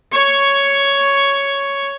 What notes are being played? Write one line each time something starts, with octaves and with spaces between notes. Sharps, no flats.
C#5 C#6